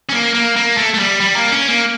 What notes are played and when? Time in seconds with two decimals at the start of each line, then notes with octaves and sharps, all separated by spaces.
0.09 C#4
0.13 A#3
0.35 A#3
0.56 A#3
0.77 A3
0.94 A3
0.99 G3
1.20 G3
1.36 A#3
1.52 C#4
1.68 A#3